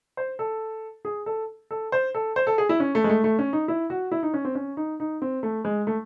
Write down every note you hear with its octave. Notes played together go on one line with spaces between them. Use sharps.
C5
A4
G#4
A4
A4
C5
A4
C5
A4
G#4
E4
C#4
A3
G#3
A3
A3
C#4
D#4
E4
F#4
E4
D#4
C#4
C4
C#4
D#4
D#4
C4
A3
G#3
A3